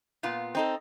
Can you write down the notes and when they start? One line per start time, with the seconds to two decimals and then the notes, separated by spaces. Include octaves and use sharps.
0.23 A#2 B3 F4
0.55 C4 D#4 A4